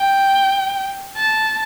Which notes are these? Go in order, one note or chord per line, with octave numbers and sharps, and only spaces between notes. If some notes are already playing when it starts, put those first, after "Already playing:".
Already playing: G5
A5